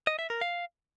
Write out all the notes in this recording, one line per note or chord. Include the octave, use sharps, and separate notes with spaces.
D#5
E5
A#4
F5